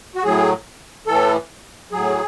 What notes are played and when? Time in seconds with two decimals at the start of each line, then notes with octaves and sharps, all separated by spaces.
0.15 F#4
0.24 A2 F#3 G#4
1.07 A2 E3 A4
1.92 A2 F#3 G#4